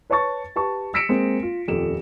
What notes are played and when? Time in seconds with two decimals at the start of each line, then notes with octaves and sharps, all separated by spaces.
0.10 B4 C#5 A5 C#6 A6
0.56 G4 B4 A5 C#6
0.94 E6 A#6 B6 C#7 D7 E7
1.09 G#3 A#3 C4
1.43 F4
1.68 D#1 F2 G4 A4 E7